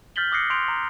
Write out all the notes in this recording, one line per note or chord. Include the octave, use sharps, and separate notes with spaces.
F6 G6 A6 B6 F#7 G7
D6 D#6 F#6 A#6 C7 C#7
C6 G6 D7 F7
A#5